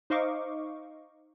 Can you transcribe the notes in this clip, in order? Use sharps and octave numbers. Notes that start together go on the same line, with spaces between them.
D#4 C5 D#5 F5 C#6 D6